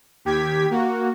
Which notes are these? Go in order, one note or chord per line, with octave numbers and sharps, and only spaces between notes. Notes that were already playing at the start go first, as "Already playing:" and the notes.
D#2 G4 G#6 B6
A#3 F#4